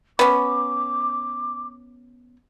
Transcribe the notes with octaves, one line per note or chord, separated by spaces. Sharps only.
B3 C#4 D6